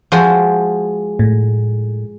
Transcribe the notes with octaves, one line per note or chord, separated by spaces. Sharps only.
F3 G#3 F#4
A2